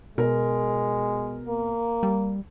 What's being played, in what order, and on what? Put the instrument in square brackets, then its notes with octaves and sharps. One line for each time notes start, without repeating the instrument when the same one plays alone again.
[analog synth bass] B2 [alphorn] G#3 [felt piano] A#4
[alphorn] A#3
[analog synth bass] G3